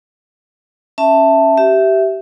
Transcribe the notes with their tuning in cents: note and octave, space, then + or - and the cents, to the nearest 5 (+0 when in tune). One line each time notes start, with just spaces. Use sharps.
C#4 -10 E5 +0 A5 +10
G4 -20 E5 +0